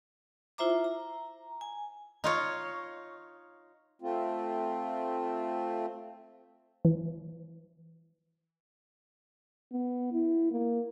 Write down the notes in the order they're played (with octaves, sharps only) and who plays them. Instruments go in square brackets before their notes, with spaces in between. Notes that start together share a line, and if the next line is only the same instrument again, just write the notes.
[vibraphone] E4 F4 C5 E5 A#5 D6
A#5
G#5
[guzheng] D#4 F4 C#5
[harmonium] A3 C4 F4
[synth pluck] E3
[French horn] B3
E4
A#3